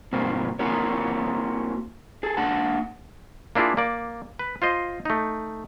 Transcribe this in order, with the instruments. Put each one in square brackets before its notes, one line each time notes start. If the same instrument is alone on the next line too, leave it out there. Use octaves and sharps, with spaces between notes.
[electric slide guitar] G2 B2 A#3 C4
A#3 C4 E4 F#4 A#4 C#5
G#4 A4
A#3 D4 F#5 A5
[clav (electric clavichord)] A#3 D4 E4 F4 G#4
A#3 D5
B4
F4 C5 D#5
A3 D#4